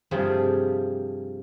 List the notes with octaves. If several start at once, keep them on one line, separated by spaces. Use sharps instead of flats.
G2 C3 F3 G3 A3 G#4